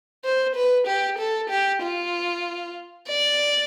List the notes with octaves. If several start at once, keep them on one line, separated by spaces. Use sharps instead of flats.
C5
B4
G4
A4
G4
F4
D5